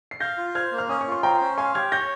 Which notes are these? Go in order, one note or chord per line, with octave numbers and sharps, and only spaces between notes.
C7
F5 G6 A#6
F4
C5 F6 G#6
A#3
F6
C#4 D#6
C#6
F4 C6
C5 G5 A#5
C#4
F5 G#5 C6
G4 F6 G#6
C#5 G6 A#6